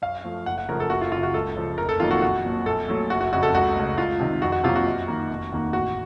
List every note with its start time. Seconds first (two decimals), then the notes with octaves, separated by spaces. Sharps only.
0.02 F#2 F5
0.24 F3 A3
0.46 F#1 F#5
0.58 F#5
0.68 F#2 C#3 F3 A3 A#4
0.80 A4
0.90 F#1 F#4
1.01 F4
1.12 F#2 C#3 F4
1.23 F#4
1.34 C#2 A4
1.56 C#3 F3
1.78 F1 A#4
1.89 A4
2.00 F2 D#3 F#3 A#3 F4
2.11 F#4
2.22 A#1 F#4
2.45 A#2 F#3
2.66 A#1 A4
2.88 A#2 F#3 A3
3.10 F#1 F#4
3.21 F#4
3.33 F2 C#3 F#4
3.43 A4
3.54 C#2 F#4
3.76 C#3 A3
3.98 C#2 F4
4.20 C3 D#3
4.42 F2 F#4
4.52 F#4
4.64 C3 F#3 A#3 F4
4.76 F#4
4.86 F#2
5.07 D#3 A#3
5.30 F1
5.52 D#2 D#3 A#3
5.73 A1 F#4